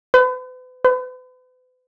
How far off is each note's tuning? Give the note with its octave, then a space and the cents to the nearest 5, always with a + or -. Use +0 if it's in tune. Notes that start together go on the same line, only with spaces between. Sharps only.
B4 +40
B4 +40